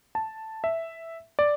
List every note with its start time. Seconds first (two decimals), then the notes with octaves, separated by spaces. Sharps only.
0.15 A5
0.64 E5
1.39 D5